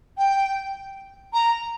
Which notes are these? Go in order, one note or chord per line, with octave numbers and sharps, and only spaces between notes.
G5
A#5